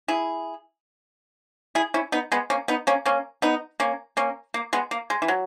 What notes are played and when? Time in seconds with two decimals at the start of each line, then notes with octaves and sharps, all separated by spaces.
0.08 E4 G#4
1.75 E4 G#4
1.94 C#4 E4
2.12 B3 D#4
2.32 G#3 B3
2.50 A#3 C#4
2.68 B3 D#4
2.87 A#3 C#4
3.06 A#3 C#4
3.42 B3 D#4
3.80 A#3 C#4
4.17 A#3 C#4
4.54 A#3
4.73 G#3 B3
4.91 A#3
5.10 G#3
5.22 E3
5.28 F#3